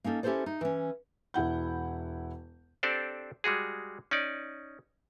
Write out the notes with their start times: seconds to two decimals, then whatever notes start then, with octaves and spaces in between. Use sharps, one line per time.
0.04 A#3 C#4 D#4 A4
0.23 C#4 E4 G4 A4 C5 D5
0.46 D#4
0.61 E3 C#4
1.34 E1 E4 F#5 G6
2.83 C4 D4 G4 A4 C5 D5
3.44 G3 G#3 F#4 G#4
4.11 C#4 D#4 D5